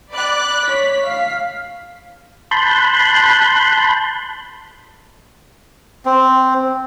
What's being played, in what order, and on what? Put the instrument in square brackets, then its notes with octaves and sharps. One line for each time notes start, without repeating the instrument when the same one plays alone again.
[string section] D5 B5 F#6
[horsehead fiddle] C#5 [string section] B6
[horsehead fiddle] F5
[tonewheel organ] A5 B5 C6 F#6 G6
[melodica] C4